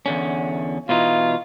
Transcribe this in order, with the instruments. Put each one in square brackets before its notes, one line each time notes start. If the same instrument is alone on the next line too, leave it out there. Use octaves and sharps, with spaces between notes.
[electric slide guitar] E2 D3 C#4
[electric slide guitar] B2 E3 D#4 [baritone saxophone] F4